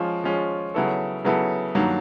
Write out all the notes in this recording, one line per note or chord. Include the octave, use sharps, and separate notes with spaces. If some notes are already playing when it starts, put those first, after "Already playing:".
Already playing: F3 G#3 C#4 F4
F3 G#3 C#4 F4
C#3 F#3 B3 E4 A4
C#3 F#3 B3 E4 A4
G2 D#3 F#3 A#3